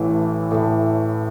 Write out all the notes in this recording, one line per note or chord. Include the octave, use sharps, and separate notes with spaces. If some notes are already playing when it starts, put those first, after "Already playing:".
Already playing: A1 A2 E3 A3
A2